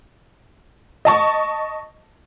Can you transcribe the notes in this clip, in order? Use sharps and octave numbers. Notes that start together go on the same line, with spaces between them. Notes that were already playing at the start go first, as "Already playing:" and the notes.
D#5 A5 C#6